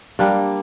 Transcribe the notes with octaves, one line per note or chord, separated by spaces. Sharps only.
G3 A#3 D4